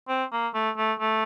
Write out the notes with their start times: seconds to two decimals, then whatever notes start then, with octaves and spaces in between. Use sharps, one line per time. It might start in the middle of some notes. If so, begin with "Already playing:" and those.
0.08 C4
0.32 A#3
0.54 A3
0.77 A3
1.00 A3